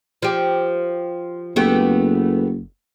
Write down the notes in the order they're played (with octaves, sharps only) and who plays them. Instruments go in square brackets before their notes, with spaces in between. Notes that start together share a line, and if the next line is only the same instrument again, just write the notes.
[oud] F3 G4
[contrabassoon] F#1 [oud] A3 B3 G4